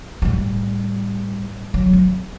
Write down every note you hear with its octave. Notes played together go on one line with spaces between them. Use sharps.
A2 G3
F#3
C4